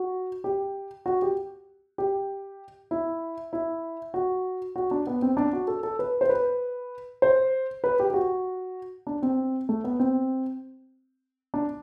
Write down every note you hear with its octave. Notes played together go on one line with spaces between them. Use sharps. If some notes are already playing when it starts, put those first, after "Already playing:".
Already playing: F#4
G4
F#4
G4
G4
E4
E4
F#4
F#4
D4
B3
C4
D4
F#4
A4
A4
B4
C5
B4
C5
B4
G4
G4
F#4
D4
C4
A3
B3
C4
D4